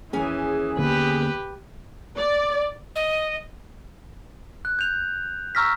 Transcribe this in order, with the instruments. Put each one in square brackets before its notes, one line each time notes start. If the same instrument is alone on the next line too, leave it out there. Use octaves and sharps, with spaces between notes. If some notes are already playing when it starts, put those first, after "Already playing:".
[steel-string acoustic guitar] D#2 C#4 G#5 [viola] E3 [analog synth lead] G#4
[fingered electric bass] D3 A#3 B3 [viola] G4 B4
[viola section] D5
[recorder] D#5
[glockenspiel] F#6
G6 F7
A#5 C#6 E6 F6 A#6 B6